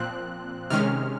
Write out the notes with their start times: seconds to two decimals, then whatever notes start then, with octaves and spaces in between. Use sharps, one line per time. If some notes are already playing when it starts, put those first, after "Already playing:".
Already playing: A#2 F3 C4 F#6
0.70 C3 D#3 G#3 C#4 F6